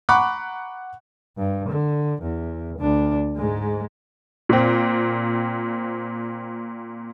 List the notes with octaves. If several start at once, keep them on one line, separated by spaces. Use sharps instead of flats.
F#5 A#5 B5 C#6 D6 F#6
G2
D3
E2
D2 D4
G#2 G#3
A#2 C4